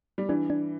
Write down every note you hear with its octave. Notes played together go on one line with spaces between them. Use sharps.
G3
E3 D4
D4